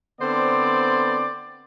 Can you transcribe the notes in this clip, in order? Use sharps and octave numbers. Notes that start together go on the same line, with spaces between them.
D3 B3 C4 C5 D5